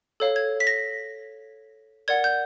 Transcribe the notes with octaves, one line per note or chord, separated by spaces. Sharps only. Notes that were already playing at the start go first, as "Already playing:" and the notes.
A4 C#5 F5
G#6
B6
A#6
A#4 D5 F#5 G#6
G6